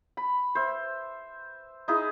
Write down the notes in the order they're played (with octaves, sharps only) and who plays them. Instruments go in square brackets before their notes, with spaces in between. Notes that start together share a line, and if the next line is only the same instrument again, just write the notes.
[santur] B5
C5 E5
D#4 E4 G#4